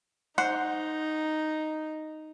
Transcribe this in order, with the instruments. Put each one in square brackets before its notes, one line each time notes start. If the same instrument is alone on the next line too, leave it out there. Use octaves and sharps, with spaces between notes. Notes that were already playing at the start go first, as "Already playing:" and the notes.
[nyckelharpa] D#4 [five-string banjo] C5 F#5